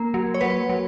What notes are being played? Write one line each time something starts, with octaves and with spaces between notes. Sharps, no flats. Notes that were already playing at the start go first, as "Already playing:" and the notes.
Already playing: A#3 A#4
F#3
C#5
F#3 B4
F#3